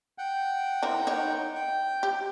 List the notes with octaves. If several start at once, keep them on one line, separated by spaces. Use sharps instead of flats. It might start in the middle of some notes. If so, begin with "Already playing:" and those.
F#5 G5
E3 C4 A#4
D#4 A#4 C#5
G5
G4